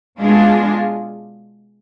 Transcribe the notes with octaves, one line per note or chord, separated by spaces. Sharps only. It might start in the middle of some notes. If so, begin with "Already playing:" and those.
B2 G#3 D4 F4 G#4